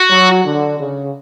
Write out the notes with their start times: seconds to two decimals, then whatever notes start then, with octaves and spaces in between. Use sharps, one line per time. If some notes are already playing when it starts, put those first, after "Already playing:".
Already playing: F#4
0.10 F#3
0.45 D3
0.80 C#3